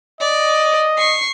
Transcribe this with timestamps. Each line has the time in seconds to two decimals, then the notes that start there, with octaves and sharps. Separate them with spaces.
0.21 D5 D#5
0.98 C#6 C7